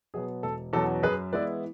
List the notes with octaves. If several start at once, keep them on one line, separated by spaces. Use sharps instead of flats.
B2 F#3 B3 G#4
E1 A4
E2 B2 F#3 C#4 A4
F#2 G#4 B4
E3 G#3 B3 E4 B4 D5